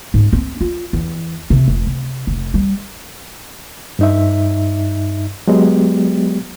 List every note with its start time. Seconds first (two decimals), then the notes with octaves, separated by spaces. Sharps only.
0.14 G#2
0.33 C4
0.61 F4
0.93 E2
1.50 C3
1.68 F1
1.86 C3
2.27 F1
2.54 G3
3.99 G2 D#4 E5
5.47 F#3 G#3 B3 G4